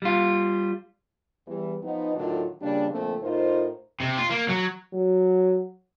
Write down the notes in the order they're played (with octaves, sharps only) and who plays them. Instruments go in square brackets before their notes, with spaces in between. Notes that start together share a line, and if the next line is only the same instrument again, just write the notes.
[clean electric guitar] G3 F4
[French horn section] E2 E3 G3
F3 B3 D#4
A2 D3 D#3 F#3 D4 F4
A#2 C#3 G3 D4
A#2 D3 F3 A3 C4
A2 D#4 F4 A#4 C5
[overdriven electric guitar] C3
F4
A#3
F#3
[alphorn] F#3